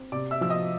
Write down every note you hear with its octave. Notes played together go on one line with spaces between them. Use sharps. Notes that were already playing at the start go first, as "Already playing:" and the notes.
Already playing: C4
C3 D5 D6
E5 E6
F3 E6
D#5 D#6